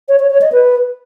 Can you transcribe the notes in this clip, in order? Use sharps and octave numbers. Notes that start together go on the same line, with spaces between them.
C#5
C#5
C#5
D#5
B4